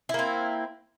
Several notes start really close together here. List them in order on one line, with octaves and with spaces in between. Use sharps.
E4 A#3 C4